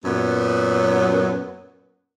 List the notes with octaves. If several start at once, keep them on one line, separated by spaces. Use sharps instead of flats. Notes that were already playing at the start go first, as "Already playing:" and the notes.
F#2 A#2 F#3 B3